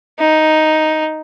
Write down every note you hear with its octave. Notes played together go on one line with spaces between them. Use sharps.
D#4